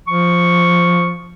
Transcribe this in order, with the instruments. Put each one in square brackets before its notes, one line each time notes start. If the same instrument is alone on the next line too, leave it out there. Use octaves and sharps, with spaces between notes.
[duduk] F3 [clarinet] C#6